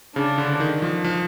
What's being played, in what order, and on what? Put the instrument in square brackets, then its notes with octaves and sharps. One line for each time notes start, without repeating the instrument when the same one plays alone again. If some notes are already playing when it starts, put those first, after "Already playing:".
[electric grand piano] C#3 [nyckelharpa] D4
[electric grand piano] D3
D#3
F3
F3